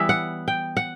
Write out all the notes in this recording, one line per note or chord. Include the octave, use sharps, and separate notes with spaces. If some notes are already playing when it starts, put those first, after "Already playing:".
Already playing: E3 G3 B3 E5
F#5
G5
F#5